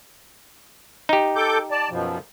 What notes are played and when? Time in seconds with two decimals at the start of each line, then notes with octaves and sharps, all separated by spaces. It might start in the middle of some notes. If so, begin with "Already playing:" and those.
1.09 D#4 G4
1.36 A4 D6 G6
1.71 D5 A5
1.90 F#2 B2 F3